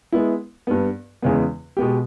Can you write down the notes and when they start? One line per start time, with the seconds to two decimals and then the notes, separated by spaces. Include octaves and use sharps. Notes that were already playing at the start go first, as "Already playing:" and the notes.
0.12 G#3 B3 E4
0.67 G2 G3 B3
1.22 E2 C#3 G#3 B3
1.77 B2 G#3 B3 G4